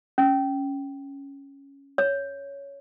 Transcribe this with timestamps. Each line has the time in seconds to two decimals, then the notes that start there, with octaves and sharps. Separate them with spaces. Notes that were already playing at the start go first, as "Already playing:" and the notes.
0.18 C#4
1.98 C#5